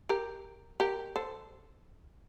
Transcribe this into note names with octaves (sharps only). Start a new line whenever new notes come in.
G4 A#4
G4 A#4
A4 C5